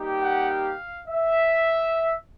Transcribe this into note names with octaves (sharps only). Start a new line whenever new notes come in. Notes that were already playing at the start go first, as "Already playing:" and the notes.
Already playing: G3 A#3 D#4 G4
F#5
F5
E5